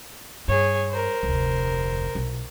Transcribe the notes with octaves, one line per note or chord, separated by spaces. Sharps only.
G2 G#4 C#5
A#4 C5
F1 D2
B1